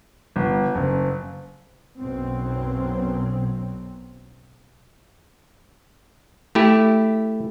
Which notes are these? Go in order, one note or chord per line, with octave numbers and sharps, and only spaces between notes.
G1
F#1
B1 F#2 B2 F#3 C4
A3 E4 G4